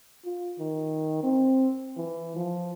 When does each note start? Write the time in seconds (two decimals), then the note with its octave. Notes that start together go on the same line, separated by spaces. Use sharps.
0.25 F4
0.59 D#3
1.23 C4
1.97 E3
2.36 F3